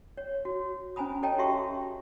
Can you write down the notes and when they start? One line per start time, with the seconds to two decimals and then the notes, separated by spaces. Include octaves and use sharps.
0.17 C#5
0.45 F#4
0.96 C#4 C5 G#5 A#5 B5 D#6
1.23 A4 C#5 D#5 G5 A5 A#5
1.38 F#4 G4 E5 C6 C#6